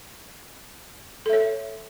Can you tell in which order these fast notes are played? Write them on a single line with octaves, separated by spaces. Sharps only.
A4 E5 C#5